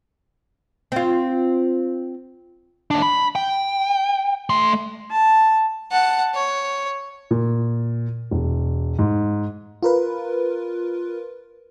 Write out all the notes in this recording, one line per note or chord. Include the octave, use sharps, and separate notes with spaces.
C4 F4
D#2 D4
B5
G5
A3 C6
A5
F#5 A5
C#5
A#2
E1
G#2
F4 A#4 B4